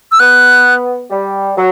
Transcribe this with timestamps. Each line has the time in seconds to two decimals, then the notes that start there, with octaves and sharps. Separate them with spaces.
0.12 E6
0.20 B3 F#6
1.10 G3
1.56 F#3